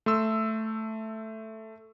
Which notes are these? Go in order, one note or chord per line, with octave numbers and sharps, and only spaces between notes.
A3 C6 E6